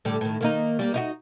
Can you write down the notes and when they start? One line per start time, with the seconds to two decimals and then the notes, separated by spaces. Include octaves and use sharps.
0.05 A2 D3 G3
0.21 A2 D#3
0.41 D#3 A#3 D#4
0.79 G3 A#3
0.94 D#4 E4 F#4